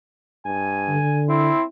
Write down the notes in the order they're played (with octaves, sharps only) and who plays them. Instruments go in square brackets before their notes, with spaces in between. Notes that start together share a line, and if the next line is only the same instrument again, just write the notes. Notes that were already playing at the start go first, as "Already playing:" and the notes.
[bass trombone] G2 [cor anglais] G#5
[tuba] D3
[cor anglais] C4 [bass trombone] E4